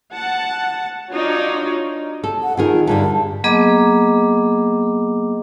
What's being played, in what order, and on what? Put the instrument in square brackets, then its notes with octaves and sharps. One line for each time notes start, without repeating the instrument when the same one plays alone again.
[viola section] F#5 A5
D4 D#4 F4 F#4 C#5
[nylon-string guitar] A4
[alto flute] F#5
[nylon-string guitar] D#3 G#4 A#4 [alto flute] F4
[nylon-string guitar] G2 D3 G3 [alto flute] A5
[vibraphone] F#3 A#3 B3 G#4 D#5 D6